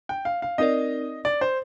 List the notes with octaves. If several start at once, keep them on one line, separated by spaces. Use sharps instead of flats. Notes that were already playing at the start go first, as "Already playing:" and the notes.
G5
F5
F5
C4 D#4 A#4 D5 D#5
D5
C5